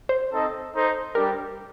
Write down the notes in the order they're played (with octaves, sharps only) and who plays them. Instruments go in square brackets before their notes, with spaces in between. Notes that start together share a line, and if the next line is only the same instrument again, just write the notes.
[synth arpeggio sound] C5
[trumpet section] C4 D#4 A4 D#5
D#4 A4 C5
[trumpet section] G3 D4 G4 [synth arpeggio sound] A#4